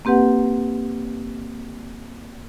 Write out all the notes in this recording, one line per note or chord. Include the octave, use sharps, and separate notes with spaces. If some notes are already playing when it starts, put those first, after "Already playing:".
A#3 C4 G4 B4 F#5